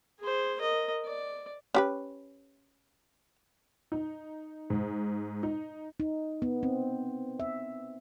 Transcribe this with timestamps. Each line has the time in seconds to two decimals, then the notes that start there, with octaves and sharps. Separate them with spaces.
0.20 G#4 C5
0.59 A#4 D#5
1.05 D5
1.75 C#4 G4 B4
3.92 D#4
4.70 G#2
5.43 D#4
6.00 D#4
6.42 B3
6.63 C4
7.40 E5